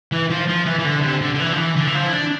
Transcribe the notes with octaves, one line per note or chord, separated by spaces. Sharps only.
E3
F3
F3
E3
E3
D3
C3
D3
D3
E3
F3
E3
D3
E3
F3
E4
D4